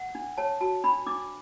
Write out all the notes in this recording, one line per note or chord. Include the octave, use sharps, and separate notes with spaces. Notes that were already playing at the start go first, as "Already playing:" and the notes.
Already playing: F#5
D4
C#5 A5
F#4 A5
D4 B5
D4 D6